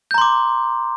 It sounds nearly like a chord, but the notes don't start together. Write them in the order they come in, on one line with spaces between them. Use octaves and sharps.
G6 A#5 C6 D6